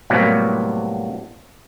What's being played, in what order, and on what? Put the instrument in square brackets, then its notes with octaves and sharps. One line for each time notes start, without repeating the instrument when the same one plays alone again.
[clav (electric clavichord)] A2 C3 F#3 G3 A#3 B3